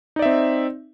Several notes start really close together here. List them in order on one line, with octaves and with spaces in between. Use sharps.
D#4 D5 E5 C4